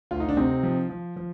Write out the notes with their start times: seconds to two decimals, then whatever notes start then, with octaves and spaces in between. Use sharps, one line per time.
0.11 D2 F4
0.20 D#4
0.29 D4
0.37 C3 C4 D#4
0.63 F3
0.89 F3
1.16 F3